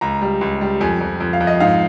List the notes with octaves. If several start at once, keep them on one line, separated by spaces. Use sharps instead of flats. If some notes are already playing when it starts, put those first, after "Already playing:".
C#2 A#5
G3
C#2
G3
F2 G#5
F2
F2
F5
F2
D#5
G#2 F5